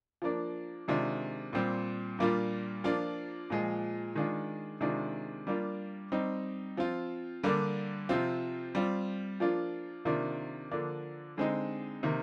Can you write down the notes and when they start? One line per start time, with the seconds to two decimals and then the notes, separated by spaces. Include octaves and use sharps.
0.22 F3 A#3 D4
0.88 C3 D#3 G#3 D4 F4
1.53 A#2 G3 C4
2.19 A#2 G3 A#3 D4 F4
2.84 F3 A#3 D4 F4
3.50 A#2 F3 G#3
4.15 D#3 G#3 D4 F4
4.81 C3 D#3 G#3 D4 F4
5.47 G3 A#3 D4 F4
6.12 G3 C4 D#4
6.77 F3 C4 F4
7.43 D3 G3 A#3 D4
8.09 C3 F3 C4 F4
8.75 G3 C4 F4
9.40 F3 A#3 D4 F4
10.05 C3 D#3 A#3 D4 F4
10.71 D3 F3 A#3 D4
11.37 D3 G#3 C4 D#4
12.03 C3 D#3 A#3